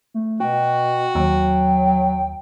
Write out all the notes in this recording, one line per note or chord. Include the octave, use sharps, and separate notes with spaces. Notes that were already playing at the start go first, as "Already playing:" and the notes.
A3
B2 F#4 G5
D#2 F#3 G5